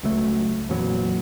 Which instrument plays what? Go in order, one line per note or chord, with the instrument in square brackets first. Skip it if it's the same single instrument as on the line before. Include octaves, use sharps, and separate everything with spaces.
[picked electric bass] C#2 F#3 A3
F2 A#2 E3 F#3